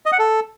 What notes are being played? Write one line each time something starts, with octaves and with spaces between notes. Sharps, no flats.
D#5
F#5
A4